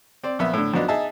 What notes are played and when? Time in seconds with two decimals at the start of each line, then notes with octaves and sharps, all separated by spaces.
0.24 C4 D5
0.39 A#1 B3 E5
0.54 A2 D3
0.74 F2 B2 B3 D4 D#4
0.88 D#4 G#4 E5 A5